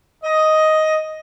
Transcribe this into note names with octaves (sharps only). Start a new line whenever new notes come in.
D#5